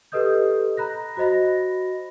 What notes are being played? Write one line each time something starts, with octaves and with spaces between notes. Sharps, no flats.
G4 A4 B4 D#5 D#6 G6
A#5 B5 F#6 A#6
F#4 C5 D#5 B5 A#6